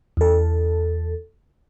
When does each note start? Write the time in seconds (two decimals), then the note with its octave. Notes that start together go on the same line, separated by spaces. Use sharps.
0.17 E2 A4